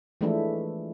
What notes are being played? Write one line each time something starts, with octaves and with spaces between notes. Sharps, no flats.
E3 F3 G#3 A3 D4 E4